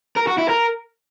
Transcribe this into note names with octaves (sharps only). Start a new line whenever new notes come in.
A#4
F#4
E4
A#4